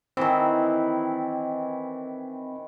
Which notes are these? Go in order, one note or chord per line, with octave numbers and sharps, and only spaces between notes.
D#3 E3 C4